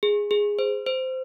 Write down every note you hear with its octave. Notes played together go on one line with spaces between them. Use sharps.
G#4
G#4
C5
C5